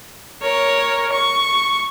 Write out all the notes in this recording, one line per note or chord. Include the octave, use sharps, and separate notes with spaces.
A#4 C#5
C#6